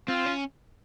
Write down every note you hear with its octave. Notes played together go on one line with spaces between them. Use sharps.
C4 F4
C#4